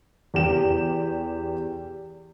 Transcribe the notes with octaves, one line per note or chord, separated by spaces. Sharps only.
E2 G4 E7